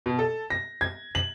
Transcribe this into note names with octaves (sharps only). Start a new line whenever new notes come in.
B2
A4
A#6
G#6
F#7